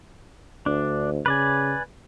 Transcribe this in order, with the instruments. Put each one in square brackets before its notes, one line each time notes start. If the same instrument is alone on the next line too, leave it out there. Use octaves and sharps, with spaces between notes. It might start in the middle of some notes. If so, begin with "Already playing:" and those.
[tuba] D2 [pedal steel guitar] D4
[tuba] C#3 [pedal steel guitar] B4 D5 G#5